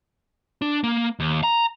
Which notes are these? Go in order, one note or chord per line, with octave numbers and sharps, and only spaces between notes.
D4
A#3
D#2
A#5